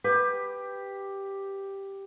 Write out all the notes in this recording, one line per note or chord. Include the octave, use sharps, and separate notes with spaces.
G4 B4